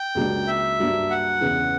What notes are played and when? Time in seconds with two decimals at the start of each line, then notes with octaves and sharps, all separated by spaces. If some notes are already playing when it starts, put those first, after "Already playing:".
Already playing: G5
0.15 C#2 C#3 F#3 A#3 D4
0.47 E5
0.79 G2 F#3 A#3 D4
1.10 F#5
1.41 E2 C#3 E3